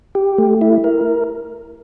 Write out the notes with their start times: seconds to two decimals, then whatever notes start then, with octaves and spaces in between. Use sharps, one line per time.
0.15 G4
0.38 A3
0.61 E4
0.84 A#4